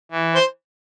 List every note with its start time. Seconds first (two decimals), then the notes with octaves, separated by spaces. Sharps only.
0.11 E3
0.35 C5